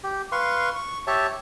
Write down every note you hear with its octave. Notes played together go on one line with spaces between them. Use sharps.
G4
B4 F5 C6 C#6
C#6
G4 C#5 E5 A5